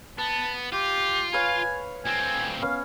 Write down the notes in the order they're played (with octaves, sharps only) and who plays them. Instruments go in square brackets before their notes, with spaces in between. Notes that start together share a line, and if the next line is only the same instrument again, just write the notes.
[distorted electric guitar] B3 [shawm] A5
[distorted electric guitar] F4 [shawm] G4
[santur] B4 C#5 F5 [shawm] G#5
[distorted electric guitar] D2 C4 [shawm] G#5
[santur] B3 C#4 [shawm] F5